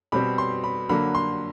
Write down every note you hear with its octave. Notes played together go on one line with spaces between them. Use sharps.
B2 G3 C4 B5
C6
B5
D3 F#3 A#3 B5
C6